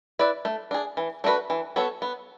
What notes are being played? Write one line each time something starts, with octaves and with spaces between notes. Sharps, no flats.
E4 B4 D5
A3
D4 G#4
E3
A3 D4 F#4 B4
E3
B3 F#4 A4 C#5
B3